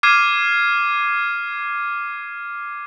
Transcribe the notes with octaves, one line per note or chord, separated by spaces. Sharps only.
D6 F6 G#6 C7 D#7